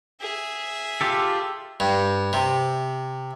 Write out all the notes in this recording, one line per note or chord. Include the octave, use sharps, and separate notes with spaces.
G#4 E5
F4 G4 A4
G2
C3